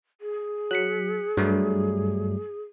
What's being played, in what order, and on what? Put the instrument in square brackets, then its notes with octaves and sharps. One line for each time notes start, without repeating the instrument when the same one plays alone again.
[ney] G#4
[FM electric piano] F#3 B6 [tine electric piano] F#6 C#7
[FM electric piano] G2 [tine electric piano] F#3 G3 A3